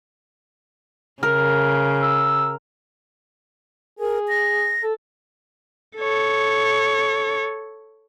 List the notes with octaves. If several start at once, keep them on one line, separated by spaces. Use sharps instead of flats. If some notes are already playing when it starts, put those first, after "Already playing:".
C#3 A#4
E6
G#4 A#4
A#6
A4
A4 C#5